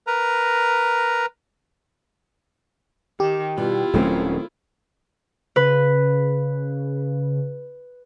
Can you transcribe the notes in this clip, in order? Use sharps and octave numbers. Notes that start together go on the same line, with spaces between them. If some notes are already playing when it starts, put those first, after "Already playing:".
A#4 B4 A#5
D#3 G4
B2 G3 E4 F4
D#1 D#3 F#3 A3 C4 C#4
C#3 B4